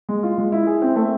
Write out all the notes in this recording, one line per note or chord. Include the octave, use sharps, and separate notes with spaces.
G#3
F4
G#3
E4
G#4
C4
A3